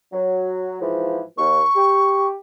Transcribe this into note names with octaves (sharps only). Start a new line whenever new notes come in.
F#3
G#2 E3 F3
D#2 C#6
G4